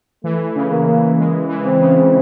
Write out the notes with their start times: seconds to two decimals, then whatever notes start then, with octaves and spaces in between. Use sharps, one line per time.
0.24 E3 A3
0.56 C#3
0.71 A#3
0.86 C#3
1.18 G#3
1.49 E3
1.65 C4
1.80 C#3